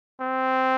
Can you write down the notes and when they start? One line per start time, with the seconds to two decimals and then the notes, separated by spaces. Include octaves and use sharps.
0.21 C4